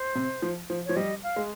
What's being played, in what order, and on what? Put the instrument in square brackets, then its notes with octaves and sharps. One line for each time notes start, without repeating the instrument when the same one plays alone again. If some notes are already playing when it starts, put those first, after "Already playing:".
Already playing: [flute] C5
[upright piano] C3
F3
F3
[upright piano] F3 [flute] C#5
[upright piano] G3 [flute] D#5
[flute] F5
[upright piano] G#3